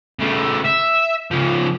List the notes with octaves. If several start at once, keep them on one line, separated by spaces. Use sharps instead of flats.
C#3 A3
E5
C#3 F3